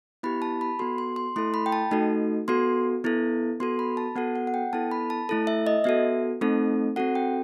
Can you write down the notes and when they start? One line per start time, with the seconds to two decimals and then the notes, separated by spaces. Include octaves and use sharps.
0.23 B3 E4 G4 B5
0.42 A5
0.61 B5
0.79 B3 F#4 A4 C6
0.98 C6
1.16 C6
1.36 A3 E4 A4 C6
1.54 B5
1.66 G5
1.72 A5
1.91 A3 D#4 F#4 A4
2.48 B3 F#4 A4 C6
3.04 B3 E4 A4
3.60 B3 F#4 A4 C6
3.79 B5
3.97 A5
4.16 B3 F#4 A4 F#5
4.36 F#5
4.47 F#5
4.54 G5
4.73 B3 E4 A4 A5
4.91 B5
5.10 A5
5.29 A3 E4 A4
5.47 E5
5.67 D#5
5.84 B3 F#4 A4 E5
6.41 A3 C4 D#4 A4
6.96 C4 F#4 A4 F#5
7.15 G5